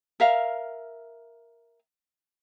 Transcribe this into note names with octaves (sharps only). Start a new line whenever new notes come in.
A#4 E5 F5